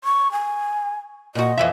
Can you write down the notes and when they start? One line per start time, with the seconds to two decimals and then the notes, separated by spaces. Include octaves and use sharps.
0.04 C#6
0.32 G#5
1.35 A#2 F#4 D#5
1.58 F2 E3 E5